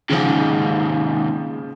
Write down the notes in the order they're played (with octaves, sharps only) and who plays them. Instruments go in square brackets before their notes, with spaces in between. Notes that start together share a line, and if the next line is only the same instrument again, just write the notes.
[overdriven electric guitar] D#2 G#2 [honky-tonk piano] C#3 F3